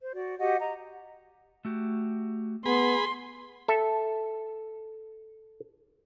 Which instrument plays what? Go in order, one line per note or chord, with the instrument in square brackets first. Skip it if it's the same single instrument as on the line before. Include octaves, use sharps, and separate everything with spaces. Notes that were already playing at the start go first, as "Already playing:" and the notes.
[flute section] C5
F#4 D5
F#4 G4 D#5 F#5
D#5 A#5
[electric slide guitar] A3 F#4 G4
[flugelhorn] B3 [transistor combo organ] G#4 B5 [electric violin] C6
[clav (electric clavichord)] A4 E5